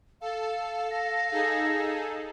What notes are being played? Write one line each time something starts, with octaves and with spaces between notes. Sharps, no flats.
A4 F5
A#6
D#4 G#4 A4